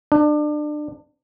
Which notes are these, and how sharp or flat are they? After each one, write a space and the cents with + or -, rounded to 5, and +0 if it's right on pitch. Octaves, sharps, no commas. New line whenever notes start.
D4 +30